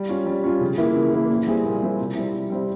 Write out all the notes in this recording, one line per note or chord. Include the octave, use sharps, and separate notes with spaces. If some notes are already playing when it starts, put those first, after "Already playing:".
Already playing: G3
C#4 F4
G3
C#4 F4
C#3
E3 A#3 E4
C#3
E3 A#3 E4
A#2
G3 C4 E4 G#4
A#2
G3 C4 E4 G#4
C3
G3 C4 E4
C3
G3 C4 E4